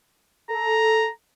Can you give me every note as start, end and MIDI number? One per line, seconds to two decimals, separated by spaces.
0.50 1.05 69
0.50 1.11 82